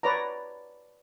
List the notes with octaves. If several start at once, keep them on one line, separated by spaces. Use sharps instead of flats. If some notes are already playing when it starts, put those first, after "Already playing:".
B4 C#5 D5 A#5